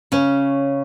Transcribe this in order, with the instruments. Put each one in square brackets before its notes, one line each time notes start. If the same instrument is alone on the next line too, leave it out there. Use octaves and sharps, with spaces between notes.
[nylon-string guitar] C#3 C#4